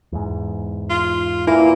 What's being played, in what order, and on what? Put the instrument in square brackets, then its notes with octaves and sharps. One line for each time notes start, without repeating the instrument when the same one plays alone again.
[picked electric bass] E2 G#2
[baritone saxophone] F4
[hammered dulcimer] A#2 E3 [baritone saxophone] A#3 [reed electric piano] E4